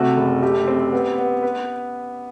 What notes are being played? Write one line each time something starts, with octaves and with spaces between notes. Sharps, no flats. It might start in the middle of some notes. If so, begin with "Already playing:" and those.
Already playing: C3 A3 F#4
F#1
A3 G4
C4
B3
B3
B4